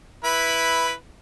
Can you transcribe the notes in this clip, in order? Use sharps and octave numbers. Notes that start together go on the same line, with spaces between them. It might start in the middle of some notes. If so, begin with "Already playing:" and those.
E4 B4